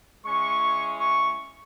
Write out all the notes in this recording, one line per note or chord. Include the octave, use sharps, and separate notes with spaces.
G#3 C#4 E4 C#6
C#6